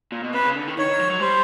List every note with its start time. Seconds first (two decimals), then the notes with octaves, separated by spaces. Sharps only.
0.12 A#2
0.24 B2
0.34 C3 B4
0.45 C#3
0.56 D3
0.68 D#3
0.78 D#3 C#5
0.88 D#3
1.00 F3
1.10 F#3
1.21 G3 C5